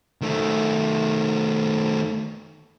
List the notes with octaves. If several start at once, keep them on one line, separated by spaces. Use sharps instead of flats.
D#3 A3